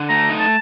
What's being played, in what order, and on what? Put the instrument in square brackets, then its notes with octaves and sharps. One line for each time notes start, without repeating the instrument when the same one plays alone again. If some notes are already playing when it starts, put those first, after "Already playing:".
Already playing: [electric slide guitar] D3
[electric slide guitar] A3 [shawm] A#5
[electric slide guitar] D#4
[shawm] A5